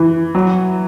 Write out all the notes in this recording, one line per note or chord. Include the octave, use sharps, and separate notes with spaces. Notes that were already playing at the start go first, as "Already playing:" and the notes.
Already playing: E3
F#3